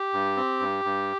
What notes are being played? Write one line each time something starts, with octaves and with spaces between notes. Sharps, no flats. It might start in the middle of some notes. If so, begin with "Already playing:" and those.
Already playing: G4
G2
C4
G2
G2